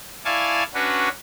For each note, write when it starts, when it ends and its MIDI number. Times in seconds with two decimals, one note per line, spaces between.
0.25 0.63 64
0.25 0.63 74
0.25 0.63 77
0.25 0.63 80
0.25 0.63 81
0.25 0.63 85
0.74 1.08 61
0.74 1.08 62
0.74 1.08 66
0.74 1.08 71